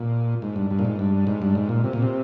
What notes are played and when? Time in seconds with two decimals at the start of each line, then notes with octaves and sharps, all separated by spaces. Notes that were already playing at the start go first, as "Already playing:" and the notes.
Already playing: A#2
0.42 G#2
0.56 G2
0.71 G2
0.79 A#2
0.85 G#2
0.99 G2
1.27 G#2
1.42 G2
1.55 G#2
1.69 A#2
1.84 C3
1.93 A#2
2.02 C3